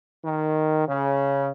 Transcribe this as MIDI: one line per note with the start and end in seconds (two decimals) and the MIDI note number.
0.24 0.84 51
0.87 1.50 49